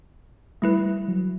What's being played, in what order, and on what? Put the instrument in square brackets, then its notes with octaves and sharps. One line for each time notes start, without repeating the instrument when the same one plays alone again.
[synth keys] G3 [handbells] A3 E4 B4
[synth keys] F#3